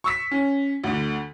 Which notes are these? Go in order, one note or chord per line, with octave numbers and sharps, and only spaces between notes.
C#6 E6 B6
C#4
D2 D3